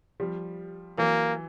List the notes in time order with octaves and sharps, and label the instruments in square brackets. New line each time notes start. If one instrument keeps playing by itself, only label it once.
[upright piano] F3 G3
[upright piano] E3 F#3 [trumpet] A#3